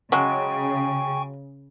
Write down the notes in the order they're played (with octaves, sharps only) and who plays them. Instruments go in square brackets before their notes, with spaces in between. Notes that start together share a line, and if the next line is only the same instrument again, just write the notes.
[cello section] C#3 [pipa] F#3 G#3 [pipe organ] G5 G#5 C#6